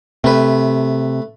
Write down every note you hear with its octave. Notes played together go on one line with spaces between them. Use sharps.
C3 A3 B4